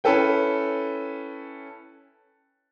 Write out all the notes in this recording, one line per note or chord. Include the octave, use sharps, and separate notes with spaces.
C#4 E4 A4 B4 G5